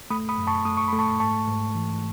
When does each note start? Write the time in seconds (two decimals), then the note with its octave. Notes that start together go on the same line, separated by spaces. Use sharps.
0.10 A3 B5 D#6
0.29 B5 D#6
0.38 F#2
0.47 A5 C#6
0.65 A3 D#6
0.77 C#6
0.88 A3 B5
0.99 A5 C#6
1.20 G#2 A5 C#6
1.48 G#2
1.75 E3